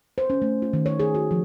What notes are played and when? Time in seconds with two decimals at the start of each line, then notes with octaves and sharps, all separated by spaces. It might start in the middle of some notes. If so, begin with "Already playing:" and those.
0.18 C5
0.30 C#4
0.42 A3
0.62 F4
0.73 D#3
0.86 C#5
1.00 G#4
1.15 F#4
1.31 F3